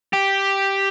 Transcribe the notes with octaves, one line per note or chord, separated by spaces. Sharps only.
G4